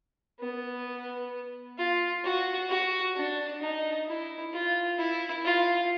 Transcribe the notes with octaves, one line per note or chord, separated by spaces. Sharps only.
B3
F4
F#4
F#4
D4
D#4
E4
F4
E4
F4